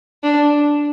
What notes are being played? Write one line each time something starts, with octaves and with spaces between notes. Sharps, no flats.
D4